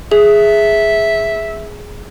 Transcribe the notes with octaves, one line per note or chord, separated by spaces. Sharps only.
G#4 E5